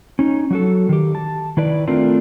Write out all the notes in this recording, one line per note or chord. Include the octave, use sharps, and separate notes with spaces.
C#4 D#4
F#3 F#4 A4
D#3 G4
A5
D#3 E4 B4 D5
A3 C4 D4 F4 A#4